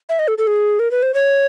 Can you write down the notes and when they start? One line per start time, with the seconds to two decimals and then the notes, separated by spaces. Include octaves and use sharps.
0.09 E5
0.19 D#5
0.28 A4
0.38 A4
0.47 G#4
0.79 A#4
0.91 B4
1.03 C5
1.14 C#5